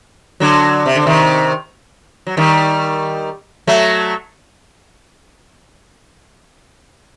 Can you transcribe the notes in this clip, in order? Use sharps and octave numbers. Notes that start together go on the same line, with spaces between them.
D3 F#3
C3
D3
C3 D#3
F#3
D#3 G3
F#3 A3